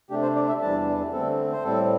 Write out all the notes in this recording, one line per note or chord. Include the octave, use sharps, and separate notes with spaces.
C3 A3 D4 G4
C5
D5
E5
E2 E3 G3 D4 A5
D3 A3 C4 A4
C5
A2 G3 C4 A4